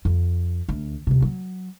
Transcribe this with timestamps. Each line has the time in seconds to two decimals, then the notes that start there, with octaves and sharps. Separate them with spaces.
0.05 F2
0.69 D2
1.07 D#2 C3
1.22 F#3